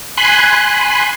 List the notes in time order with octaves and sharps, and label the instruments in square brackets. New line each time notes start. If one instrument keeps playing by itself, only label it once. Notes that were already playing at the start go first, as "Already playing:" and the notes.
[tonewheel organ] G#5 B5 C6 F#6